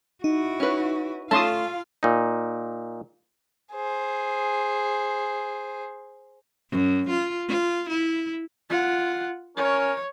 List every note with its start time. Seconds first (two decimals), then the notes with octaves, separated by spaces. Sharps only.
0.24 D#4 E4 F#4
0.60 C#4 B4
1.31 A3 C#4 F4 A4 F5 A5 C6 D#6
2.03 A#2 D#4
3.73 G#4 C5
6.70 F#2
7.10 F4
7.47 F4
7.90 E4
8.70 F4 F#5
9.57 C#4 A#4 C#5